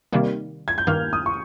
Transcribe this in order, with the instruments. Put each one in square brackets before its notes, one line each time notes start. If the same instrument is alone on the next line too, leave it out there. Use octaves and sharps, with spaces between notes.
[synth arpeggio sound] C3 D#3 G3 A#3
[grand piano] G#6
G6
[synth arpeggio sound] G2 D#3 A#3 [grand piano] F6
[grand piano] D#6
C#6